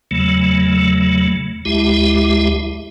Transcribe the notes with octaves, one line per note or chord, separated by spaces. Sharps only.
E2 C#3 F#3 A3
D2 G#3 E4 G4 E5